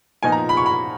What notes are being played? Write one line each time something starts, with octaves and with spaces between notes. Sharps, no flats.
A#2 F3 B3 D#4 G#5
A#5
B5
C#6
B5